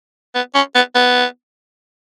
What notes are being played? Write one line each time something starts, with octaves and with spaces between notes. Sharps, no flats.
B3
C#4
B3
B3